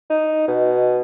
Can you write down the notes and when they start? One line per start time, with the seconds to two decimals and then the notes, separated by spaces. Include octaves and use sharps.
0.10 D#4
0.48 B2